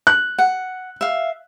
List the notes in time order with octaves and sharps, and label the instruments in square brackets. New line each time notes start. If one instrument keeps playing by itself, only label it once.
[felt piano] F#6
[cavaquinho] F#5
E5 F5